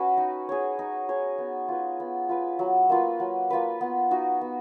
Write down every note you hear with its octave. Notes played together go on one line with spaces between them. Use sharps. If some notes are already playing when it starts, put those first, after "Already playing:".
Already playing: C#4 F#4 B4
D#4
G#4 C#5
D#4
G#4 C#5
B3
F4 B4
B3
F4 B4
F#3
A#3 F4 B4
F#3
A#3 F4 B4
B3
D#4 F#4
B3